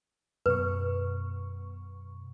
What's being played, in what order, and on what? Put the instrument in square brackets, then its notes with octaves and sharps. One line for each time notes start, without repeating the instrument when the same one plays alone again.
[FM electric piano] F#2 B2 C#6 [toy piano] B4